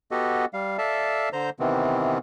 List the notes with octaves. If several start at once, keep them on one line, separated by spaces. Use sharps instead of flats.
B3 F#4 G4 A4 D#5
G3 F5
A4 D5 E5 F5 A5
D3 C5 A#5 G6
C3 D#3 E3 B3 C4